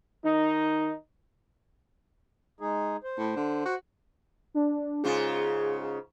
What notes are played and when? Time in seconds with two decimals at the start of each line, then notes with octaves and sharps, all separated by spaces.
0.24 D#3 D#4
2.61 G#3 D#4 G#4
3.04 C5
3.18 A2
3.36 D3
3.65 F#4
4.54 D4
5.04 G#2 C#3 F4 G#4